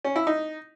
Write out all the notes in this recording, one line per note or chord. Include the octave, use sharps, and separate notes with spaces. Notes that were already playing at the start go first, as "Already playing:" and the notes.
C#4
E4
D#4